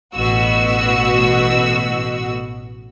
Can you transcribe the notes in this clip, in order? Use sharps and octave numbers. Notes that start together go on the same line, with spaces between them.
A1 B2 F#4 E6